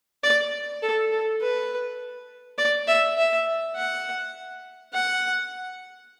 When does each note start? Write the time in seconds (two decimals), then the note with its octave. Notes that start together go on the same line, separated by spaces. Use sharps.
0.23 D5
0.82 A4
1.12 A4
1.41 B4
2.58 D5
2.88 E5
3.18 E5
3.76 F#5
4.94 F#5